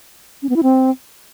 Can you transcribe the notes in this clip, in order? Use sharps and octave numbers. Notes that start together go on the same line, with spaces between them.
C#4
B3
E4
C4